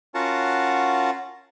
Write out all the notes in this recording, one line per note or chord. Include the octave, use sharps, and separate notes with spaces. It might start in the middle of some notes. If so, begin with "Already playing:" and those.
C#4 F4 F#4 A#4 F#5 A5